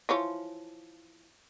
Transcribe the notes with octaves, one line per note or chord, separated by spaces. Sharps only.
E3 F3 C#5